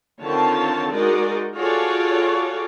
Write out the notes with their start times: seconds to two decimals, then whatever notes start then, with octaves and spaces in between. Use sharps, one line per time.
0.22 D3 D#3 C4 F4 C#5 A5
0.92 G#3 D#4 F#4 A#4 D5 D#5
1.55 F4 F#4 G#4 A4 C#5 D5